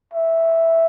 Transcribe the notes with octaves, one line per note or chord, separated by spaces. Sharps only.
E5